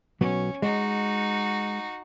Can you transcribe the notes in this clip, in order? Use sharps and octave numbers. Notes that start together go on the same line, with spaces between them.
B1 F#3 B3 C#4
G#3 D#4 F#4